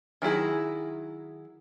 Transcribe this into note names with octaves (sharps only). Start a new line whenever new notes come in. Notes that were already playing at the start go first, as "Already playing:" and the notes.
D#3 F#3 E4 G#4